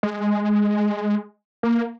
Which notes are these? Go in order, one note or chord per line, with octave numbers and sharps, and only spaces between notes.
G#3
A#3